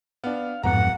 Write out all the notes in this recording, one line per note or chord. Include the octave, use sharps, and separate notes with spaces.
B3 D4 F5
D1 F2 G#2 B3 F#5 A#5